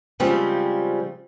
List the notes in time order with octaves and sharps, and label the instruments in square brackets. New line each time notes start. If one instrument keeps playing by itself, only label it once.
[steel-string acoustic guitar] C#3 F3 G3 G#3 C4